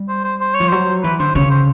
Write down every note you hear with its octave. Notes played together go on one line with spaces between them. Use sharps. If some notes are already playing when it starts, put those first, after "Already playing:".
Already playing: G3
C5
C5
C5
C#5
F3
F#3 C5
E3 B4
D3 C5
C#3 C#5
C5